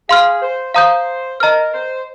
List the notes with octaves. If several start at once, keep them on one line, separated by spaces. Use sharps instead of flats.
G#4 F5 C6 F6
C5
C5 F5 A#5 D#6 G6
A#4 D#5 A#5 F6
C5